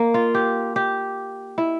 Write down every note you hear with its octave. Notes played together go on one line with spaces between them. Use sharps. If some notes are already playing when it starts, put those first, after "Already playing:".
Already playing: A#3
F4
G4
G4
E4